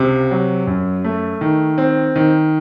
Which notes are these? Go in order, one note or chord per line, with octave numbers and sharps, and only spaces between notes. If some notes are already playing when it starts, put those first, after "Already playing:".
Already playing: C#2 C3
F#3
F#2
A3
D#3
C4
D#3